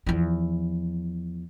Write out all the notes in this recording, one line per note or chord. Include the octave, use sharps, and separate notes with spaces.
E2 F3